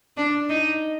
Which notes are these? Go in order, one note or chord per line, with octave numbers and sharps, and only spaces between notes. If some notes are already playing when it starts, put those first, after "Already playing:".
D4
D#4